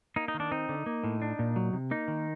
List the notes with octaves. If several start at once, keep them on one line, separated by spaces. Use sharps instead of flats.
A#3 D#4
D#4
D#3
D4
C4 D#4
D3
A#3
A2
D4
A#2
F#3
C3
A#3 D#4
D#3